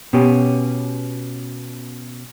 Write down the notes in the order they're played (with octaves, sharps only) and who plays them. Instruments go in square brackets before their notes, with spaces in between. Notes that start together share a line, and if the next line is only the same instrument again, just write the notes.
[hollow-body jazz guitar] B2 B3 C#4 G4